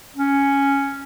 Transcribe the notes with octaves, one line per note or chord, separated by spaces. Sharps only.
C#4